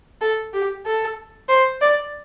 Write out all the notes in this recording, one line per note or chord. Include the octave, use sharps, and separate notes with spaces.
A4
G4
A4
C5
D5